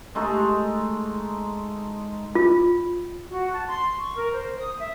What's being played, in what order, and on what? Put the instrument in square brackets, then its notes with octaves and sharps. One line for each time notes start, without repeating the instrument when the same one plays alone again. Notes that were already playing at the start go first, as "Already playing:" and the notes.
[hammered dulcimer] G#3 A3 D#4 A4
[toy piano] F4
[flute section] F#4
A5
C6
C#6
A#4
C5
D#6
E5